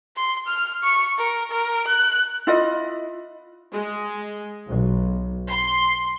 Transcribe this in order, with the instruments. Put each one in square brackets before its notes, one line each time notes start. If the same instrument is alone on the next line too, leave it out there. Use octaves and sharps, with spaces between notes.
[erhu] C6
F6
C#6
A#4
A#4
F#6
[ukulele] E4 F4 D#5
[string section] G#3
B1
C6